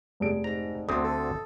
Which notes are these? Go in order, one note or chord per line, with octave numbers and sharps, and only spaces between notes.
F1 G#4 D7
G#2 A#5
D2 D3 C4 D#6
A4